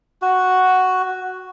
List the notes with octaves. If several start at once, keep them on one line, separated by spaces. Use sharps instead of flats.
F#4